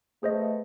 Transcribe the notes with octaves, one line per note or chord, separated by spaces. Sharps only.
A3 B3 G#4 C5 D#5